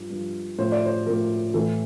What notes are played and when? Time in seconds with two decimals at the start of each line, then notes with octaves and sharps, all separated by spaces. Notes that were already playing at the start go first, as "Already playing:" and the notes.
Already playing: G2 F3
0.10 G2 F3
0.59 A2 F3 C5
0.72 D5
0.86 C5
1.06 A2 F3 A#4
1.54 A2 E3 A4